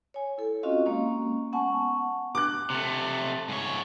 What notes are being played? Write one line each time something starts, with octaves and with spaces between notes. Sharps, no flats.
C#5 G#5
E4 A4
C4 C#4 F4 F#4 D#5 F5
G#3 A#3 C#4
B3 F#5 G#5 A5 C#6
D6 F#6
C3 A3
G#2 C#5